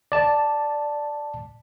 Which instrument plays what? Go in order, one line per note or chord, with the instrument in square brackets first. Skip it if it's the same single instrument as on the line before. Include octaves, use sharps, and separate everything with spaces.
[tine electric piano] D5 A5